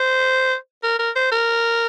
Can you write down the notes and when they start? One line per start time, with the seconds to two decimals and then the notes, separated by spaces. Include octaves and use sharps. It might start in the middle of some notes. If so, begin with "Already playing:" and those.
Already playing: C5
0.83 A#4
0.99 A#4
1.16 C5
1.31 A#4